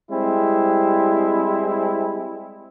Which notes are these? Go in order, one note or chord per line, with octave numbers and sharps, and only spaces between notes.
G3 G#3 C4 E4